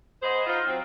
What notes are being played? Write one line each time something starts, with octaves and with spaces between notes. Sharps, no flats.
B3 G#4 C5 D#5
D#4 F4
F#3 C4